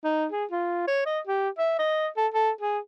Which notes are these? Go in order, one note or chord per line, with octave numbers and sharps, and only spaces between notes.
D#4
G#4
F4
C#5
D#5
G4
E5
D#5
A4
A4
G#4